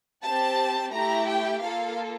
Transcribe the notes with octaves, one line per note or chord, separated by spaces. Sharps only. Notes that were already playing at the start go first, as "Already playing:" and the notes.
C4 G4 A5
A3 E4 G4 A#5
G5
A#3 F4 A4 F5